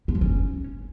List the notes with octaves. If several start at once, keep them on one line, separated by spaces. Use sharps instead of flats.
B3
F3
C#4